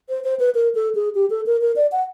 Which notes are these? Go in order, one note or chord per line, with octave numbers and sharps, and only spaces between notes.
C5
C5
B4
A#4
A4
G#4
G4
A4
A#4
A#4
D5
F#5